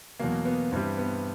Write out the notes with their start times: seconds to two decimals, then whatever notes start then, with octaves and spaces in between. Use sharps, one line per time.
0.20 E2 B2 F#3 A#3
0.45 B3
0.72 G2 E3 G3 C4
0.98 B3